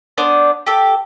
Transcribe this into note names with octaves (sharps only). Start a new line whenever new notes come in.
B3 D4 C5 D5
G4 A4